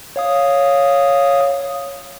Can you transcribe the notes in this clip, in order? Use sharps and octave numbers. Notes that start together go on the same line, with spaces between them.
C#5 F5 D#6